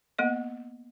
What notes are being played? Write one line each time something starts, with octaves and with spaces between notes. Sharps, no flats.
A#3 B3 D#5